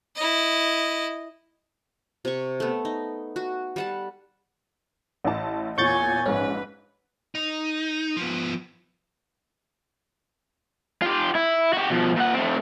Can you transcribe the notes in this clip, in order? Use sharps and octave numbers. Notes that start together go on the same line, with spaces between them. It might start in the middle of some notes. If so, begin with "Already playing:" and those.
E4 D#5
C3 C#6
A3 B3
D#4
F#4
G3 F#5 A5
A1 E4 A5
E2 A#2 C#5 G#5 C#6 G6 A6
A#1 G#2 C#4 B4
D#4
F3 B3
F4 G4
E4
F#4 G4
B2 F3
A#2 F#5
A3 C4